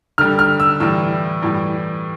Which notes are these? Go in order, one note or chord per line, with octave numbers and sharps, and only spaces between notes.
D3 G3 F6
F6
E6
A2 E3 G3 E6
A2 E3 G3